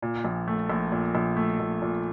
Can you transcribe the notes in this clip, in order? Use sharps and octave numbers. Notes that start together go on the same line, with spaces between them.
A#2
A#1
A3
A#1
A#2
A#1
A3
A#1
A#2